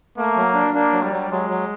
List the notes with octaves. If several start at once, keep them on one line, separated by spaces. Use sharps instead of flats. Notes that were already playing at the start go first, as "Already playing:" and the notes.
A3 A#3
F#3
D4
A#3 D4
F#3
G3
F#3
F#3 G#3
F#3